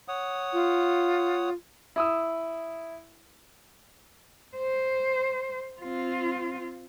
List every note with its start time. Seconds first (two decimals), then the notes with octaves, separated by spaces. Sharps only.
0.08 C#5 F#5 D#6
0.52 F4
1.96 E4 D#6 E6
4.57 C5
5.81 C4 F4